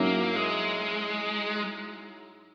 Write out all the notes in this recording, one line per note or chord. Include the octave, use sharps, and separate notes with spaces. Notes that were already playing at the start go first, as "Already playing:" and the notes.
Already playing: G#2 F#3 A#3 C#4 E4
G#3